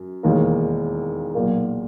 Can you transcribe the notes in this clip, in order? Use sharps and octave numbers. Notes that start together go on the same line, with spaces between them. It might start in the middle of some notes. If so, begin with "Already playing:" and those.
Already playing: F#2
E1 D#2 D#3 A#3
B1 A#2 A#3